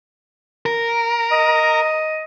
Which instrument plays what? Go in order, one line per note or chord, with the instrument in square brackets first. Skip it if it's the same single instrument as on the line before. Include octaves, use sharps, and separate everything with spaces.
[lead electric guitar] A#4
[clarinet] D#5